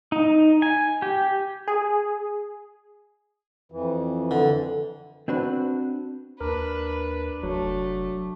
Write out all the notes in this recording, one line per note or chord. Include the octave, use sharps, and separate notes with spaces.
D#4
G#5
G4
G#4
F2 E3
D3
C4 D4 F#4 B4
D#2 D4 A#4 B4
F1 F#3 A3